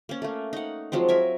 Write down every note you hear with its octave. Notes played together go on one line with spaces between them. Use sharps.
A#3 C#4
A3 A#3
D#4 F#5
F3 F#3 G#3 C4
A#4 E5 G#5